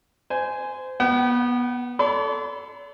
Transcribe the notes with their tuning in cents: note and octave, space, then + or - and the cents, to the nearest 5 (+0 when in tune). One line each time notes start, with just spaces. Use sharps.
C5 -25 G#5 +0
B3 -20 F#5 +45
A4 +0 D5 -45 C6 -40